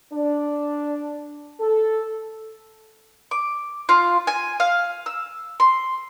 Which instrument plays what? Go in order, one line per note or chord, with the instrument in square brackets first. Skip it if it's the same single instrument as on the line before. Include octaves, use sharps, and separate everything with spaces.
[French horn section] D4
A4
[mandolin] D6
F4
G#5
F5
E6
C6